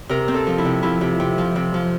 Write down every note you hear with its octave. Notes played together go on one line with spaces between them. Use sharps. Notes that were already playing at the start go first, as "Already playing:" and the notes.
C3 A#4
C4
A4
F3
E4
C3
F3 E4
C3
C3
F3
C3
F3